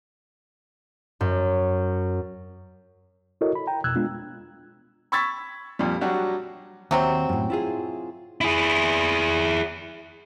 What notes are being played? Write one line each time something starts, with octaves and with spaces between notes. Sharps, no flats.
F#2
E4 F#4 A4 A#4 C#5 D#5
B5
G5 A#5
F2 B2 E6 F#6 G#6
G#3 B3 D4 F4
B5 C#6 E6 G#6 A6 B6
F2 A#2 G3
F#3 G3 D4 F#4 G4
D#2 C3 F#3 C4
F#2 A2
E4 F4 G#4
E4 G#4